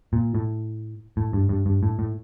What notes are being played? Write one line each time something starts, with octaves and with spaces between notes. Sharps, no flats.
A#2
A2
A2
G2
G2
G2
A2
A2